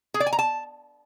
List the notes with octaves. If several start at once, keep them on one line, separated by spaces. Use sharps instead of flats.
G#4
D5
G#5
A#5
A5